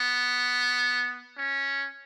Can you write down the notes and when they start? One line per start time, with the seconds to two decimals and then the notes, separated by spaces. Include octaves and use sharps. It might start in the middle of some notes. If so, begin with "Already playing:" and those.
Already playing: B3
1.37 C#4